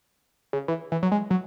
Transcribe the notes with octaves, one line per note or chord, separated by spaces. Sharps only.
C#3
E3
E3
F#3
G#3
F#3